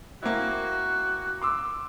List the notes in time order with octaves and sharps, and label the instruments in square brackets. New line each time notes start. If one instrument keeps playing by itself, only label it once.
[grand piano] A#3 C4 E4 [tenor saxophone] F#4
[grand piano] C6 D6 E6